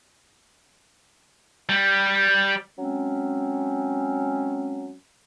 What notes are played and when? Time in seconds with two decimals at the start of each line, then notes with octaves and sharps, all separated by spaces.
1.69 G3
2.78 F#3 G#3 C4 C#4